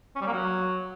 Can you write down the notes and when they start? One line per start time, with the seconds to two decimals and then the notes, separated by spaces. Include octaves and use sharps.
0.16 C#4
0.21 G3
0.27 A#3
0.33 F#3